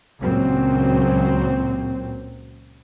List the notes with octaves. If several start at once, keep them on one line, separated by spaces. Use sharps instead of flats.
C#2 A#2 F#3 C4